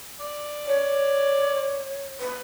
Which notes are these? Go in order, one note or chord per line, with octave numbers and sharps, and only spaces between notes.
D5
C#5
B4